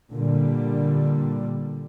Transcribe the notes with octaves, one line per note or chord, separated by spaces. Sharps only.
A#2 D3 G3